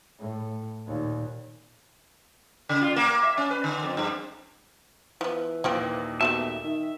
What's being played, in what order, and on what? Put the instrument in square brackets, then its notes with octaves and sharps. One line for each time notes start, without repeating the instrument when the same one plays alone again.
[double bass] A2
D#2 A#2
[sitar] C#3
F4
A#3
E5
C#4
B4
D3
F2
G2
[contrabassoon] E3 [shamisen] F3 B3
[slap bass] D#2 A#2 [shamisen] F3 F4 G5
[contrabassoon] B2 [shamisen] A3 G4 A5 [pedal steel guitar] E5
[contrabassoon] D#3